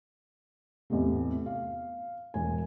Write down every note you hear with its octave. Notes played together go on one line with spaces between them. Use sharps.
E2 A2 C3
F5
E1 G#5